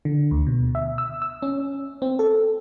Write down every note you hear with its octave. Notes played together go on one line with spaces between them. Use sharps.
D3
D2
B2
E5
E6
E6
C#4
C4
A4